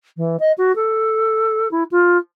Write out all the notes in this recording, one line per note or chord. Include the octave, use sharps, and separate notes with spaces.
E3
D#5
F#4
A4
E4
F4